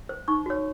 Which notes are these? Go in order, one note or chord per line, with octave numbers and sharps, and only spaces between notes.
C5
D#4 C#6
F#4 C#5